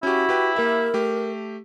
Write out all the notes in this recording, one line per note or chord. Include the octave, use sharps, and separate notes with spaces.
C#4 E4 F#4 G4
G4 B4 G5
A#3 G4 A#4 E5
A3 G4